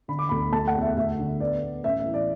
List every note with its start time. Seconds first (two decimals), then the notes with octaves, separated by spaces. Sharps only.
0.08 D3 B5
0.19 D6
0.29 D2 B5
0.52 A3 A5
0.68 F#5
0.74 E2
0.81 E5
0.97 D2 E5
1.19 D3
1.40 B3 D5
1.62 B3
1.84 A1 E5
2.00 E5
2.06 E3
2.14 D5